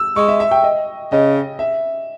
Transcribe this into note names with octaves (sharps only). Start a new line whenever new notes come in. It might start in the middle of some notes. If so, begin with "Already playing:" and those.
Already playing: E6
G#3 C#6
E5
E5
G5
D#5
C#3 D#5
E5